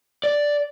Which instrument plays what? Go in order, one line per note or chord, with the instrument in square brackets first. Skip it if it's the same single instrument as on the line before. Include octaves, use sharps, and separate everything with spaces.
[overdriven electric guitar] D5